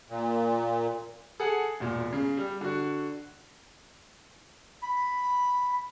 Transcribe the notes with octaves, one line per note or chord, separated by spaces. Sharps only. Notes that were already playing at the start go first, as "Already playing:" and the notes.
A#2
G#4 A4 F#5 A5
E1 A#2
C#3
G3
D3 F#4
B5